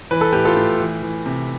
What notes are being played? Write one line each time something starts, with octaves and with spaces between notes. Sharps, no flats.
E3 B4
A4
A2 G4 B4
F4 A4
A2
E3
E3
C3